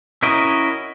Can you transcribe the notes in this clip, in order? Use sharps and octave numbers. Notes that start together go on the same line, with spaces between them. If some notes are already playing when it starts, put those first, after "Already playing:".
C#4 E4 F#4 A#4 D#5